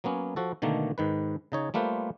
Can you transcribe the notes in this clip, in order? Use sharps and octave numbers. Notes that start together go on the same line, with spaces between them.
F#3 A#3 B3 C#4
F3 F#4 A4
B2 D3 D#3 A3 A#3
G#2 D#3 B4
C#3 D#4 C#5
G3 A3 A#3 F4 B4 C5